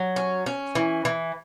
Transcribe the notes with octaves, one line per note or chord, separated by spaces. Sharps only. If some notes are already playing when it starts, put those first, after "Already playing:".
Already playing: F#3
C#4
C#4
E3
E3